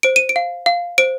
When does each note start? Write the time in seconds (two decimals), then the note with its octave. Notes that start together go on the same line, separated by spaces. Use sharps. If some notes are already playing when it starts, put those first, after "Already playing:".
0.03 C5 D7
0.16 D#7
0.29 D7
0.36 F5
0.66 F5
0.98 C5 D7